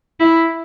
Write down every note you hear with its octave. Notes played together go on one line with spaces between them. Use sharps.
E4